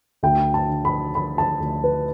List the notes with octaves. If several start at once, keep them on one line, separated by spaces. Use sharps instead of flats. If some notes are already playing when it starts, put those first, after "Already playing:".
D2 G5
A5
D3
B5
D3 B5
A5
D2
B4